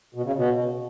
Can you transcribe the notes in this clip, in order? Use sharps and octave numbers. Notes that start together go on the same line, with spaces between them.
B2
C#3
B2